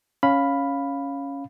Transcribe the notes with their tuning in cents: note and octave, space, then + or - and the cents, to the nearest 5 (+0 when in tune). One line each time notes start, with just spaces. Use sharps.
C#4 +0 F5 +5 B5 +0